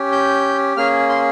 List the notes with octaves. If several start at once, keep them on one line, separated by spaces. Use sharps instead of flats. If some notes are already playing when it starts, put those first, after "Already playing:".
Already playing: C#4 G4
G6
A#3 C#4 G#4 F6
C6